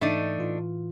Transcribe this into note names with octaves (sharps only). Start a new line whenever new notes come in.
G#2 E3 A3 D4 D#4
A2 E3 F4